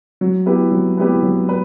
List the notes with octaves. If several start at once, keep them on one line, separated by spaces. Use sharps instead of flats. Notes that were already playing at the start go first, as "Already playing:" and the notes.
F#3
B3 E4 G4 B4
F#3
B3 E4 G4 B4
F#3
B4